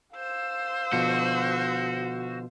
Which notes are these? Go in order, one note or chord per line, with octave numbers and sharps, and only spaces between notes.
C5 F5 E6
B2 D3 F3 F#4